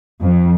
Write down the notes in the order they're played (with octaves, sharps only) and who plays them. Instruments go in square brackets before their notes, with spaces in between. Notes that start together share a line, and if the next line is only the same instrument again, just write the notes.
[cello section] F2